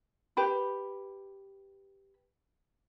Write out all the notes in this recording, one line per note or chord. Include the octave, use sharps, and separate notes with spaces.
G4 B4 B5